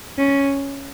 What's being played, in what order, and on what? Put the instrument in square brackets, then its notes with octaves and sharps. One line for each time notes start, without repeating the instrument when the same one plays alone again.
[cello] C#4